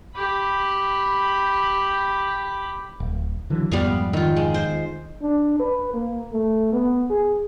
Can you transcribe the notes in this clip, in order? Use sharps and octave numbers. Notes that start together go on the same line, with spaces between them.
G4 B5
D1
D3 E3 F#3
F2 G#2 G3 B3 F5
D#3 F4
G#3
C5
D4
B4
A#3
A3
B3
G#4